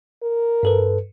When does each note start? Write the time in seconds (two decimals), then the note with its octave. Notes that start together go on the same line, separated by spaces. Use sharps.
0.22 A#4
0.63 G2 A4 B4